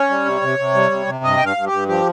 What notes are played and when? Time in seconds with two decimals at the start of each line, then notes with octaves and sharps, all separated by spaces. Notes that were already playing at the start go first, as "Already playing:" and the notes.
Already playing: C#4 C#5
0.09 G3
0.25 C3
0.42 C3
0.59 C3
0.75 G3
0.91 C3
1.07 C3
1.24 G2 D#5
1.37 G5
1.40 G2
1.45 F5
1.57 G2
1.66 G4
1.72 G2
1.88 F3 G4